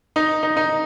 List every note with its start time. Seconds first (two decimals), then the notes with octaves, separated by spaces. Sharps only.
0.16 D#4
0.43 D#4
0.57 D#4